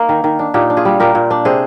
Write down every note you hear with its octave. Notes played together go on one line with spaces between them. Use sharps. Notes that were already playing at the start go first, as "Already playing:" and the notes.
Already playing: A#3 D#4
D#3
D#3
D4
A#2 D#4 G4
D4
F4 G#4
G3
A#2 G4 A#4
A#2
D4
C3 G#4 C5